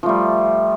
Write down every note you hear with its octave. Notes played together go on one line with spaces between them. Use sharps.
F3 G3 A3